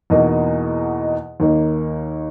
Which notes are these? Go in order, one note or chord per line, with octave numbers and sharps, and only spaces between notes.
E2 B2 A#3 D#4
D#2 D#3 A#3 D#4